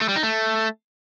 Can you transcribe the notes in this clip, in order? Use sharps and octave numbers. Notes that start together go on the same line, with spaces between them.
A3
G3
D#4
A3